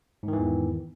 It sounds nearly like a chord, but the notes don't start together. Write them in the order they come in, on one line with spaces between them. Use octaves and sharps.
G#2 D#3 E3 E2